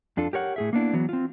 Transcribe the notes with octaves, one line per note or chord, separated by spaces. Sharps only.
F2 D4 F4 A4
G4 A#4 C#5 F#5
A2 G#4 E5
A#3 B3 D4 E4
E3 F#3 B3
C4 F4